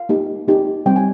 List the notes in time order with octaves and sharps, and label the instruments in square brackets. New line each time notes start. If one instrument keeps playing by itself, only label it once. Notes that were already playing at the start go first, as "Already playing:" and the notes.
Already playing: [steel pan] F5
A#3 D#4 G4
A#3 D#4 G4
G3 C4 G4 G5
G#5